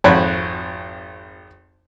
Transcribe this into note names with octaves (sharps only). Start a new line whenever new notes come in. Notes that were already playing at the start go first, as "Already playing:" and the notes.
G#1 F2 F#4 C#5 B5 F#6